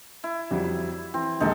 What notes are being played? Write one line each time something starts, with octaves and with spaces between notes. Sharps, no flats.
E4
F2 F#3 G3
E3 C4
A#1 D#2 G#3 D#4 A4